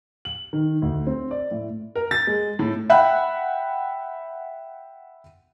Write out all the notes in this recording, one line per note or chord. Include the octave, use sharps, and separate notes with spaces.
F#7
D#3
D2
C4
D5
A2
A#4
A6
G#3
A2
E5 F#5 G5 B5 F#6